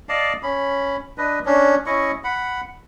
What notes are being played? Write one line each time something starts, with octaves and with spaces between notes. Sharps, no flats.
D5 D#5 F5 A5
C#4 B5
D4 B4 D#5
C#4 D4
C#4 E4 D#5 C#6
F#5 B5